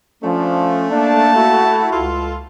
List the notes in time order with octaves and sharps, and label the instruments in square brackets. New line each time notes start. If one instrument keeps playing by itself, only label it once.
[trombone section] F3 [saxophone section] A3 [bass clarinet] C#4 [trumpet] D4
[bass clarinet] A#3 [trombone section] D4 [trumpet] A5
[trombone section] E4 F#4
[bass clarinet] C#2 [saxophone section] F4 A4